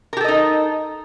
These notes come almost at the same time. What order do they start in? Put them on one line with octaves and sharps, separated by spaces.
A#4 G4 A4 D#5 D#4